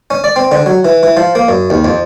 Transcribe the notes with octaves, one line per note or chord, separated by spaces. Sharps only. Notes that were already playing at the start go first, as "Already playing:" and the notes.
C#4
D5
C4
D3
F#3
E3
E3
F3
A#3
F#2
D#2
F2